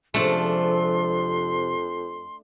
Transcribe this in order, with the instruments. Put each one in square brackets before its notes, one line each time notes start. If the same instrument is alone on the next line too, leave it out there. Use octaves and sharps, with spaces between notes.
[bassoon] F2 [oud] C3 F3 G#3 [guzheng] A3 D4 [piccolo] C6